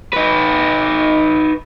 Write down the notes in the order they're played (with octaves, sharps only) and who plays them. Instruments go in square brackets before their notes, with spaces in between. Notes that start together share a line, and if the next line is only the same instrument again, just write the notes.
[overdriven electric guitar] D#4 B4